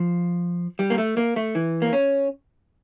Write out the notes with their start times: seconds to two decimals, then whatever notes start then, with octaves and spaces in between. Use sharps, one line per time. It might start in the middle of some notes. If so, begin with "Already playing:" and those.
Already playing: F3
0.79 G3
0.90 A#3
0.98 A3
1.17 A#3
1.36 A3
1.55 E3
1.82 A#3
1.93 C#4